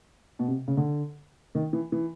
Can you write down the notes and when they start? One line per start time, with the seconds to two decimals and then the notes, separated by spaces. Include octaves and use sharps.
0.39 B2
0.48 C3
0.68 C#3
0.77 D3
1.55 D#3
1.73 E3
1.92 E3